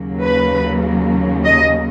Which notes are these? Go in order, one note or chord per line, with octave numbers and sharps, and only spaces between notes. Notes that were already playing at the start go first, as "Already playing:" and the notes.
Already playing: D#2 C#3 F#3 A#3
B4
D#5